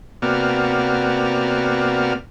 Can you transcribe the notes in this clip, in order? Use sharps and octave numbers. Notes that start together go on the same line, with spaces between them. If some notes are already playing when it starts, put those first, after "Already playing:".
C3 A#3 B3 F#4 D5 F6